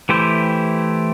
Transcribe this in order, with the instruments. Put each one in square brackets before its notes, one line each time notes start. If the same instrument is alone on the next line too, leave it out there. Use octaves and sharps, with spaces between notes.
[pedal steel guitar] E3 A3 E4 G4 C5